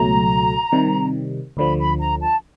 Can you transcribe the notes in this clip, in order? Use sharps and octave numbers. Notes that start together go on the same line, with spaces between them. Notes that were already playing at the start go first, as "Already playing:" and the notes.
Already playing: C#2 B2 F#3 A3 A#5
C3 D#3 G3
D2 D3 F3 B5
B5
A#5
A5